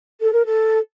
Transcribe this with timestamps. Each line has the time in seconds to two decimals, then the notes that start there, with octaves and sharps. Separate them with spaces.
0.20 A4
0.32 A#4
0.46 A4